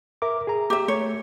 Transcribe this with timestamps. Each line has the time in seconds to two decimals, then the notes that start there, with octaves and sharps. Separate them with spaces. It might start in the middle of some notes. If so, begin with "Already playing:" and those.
0.22 A#4 E5 D6
0.47 G#4 A#5
0.70 G4 E5
0.88 A3 C#5